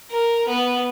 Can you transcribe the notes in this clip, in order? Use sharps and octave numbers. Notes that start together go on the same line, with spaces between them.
A#4
B3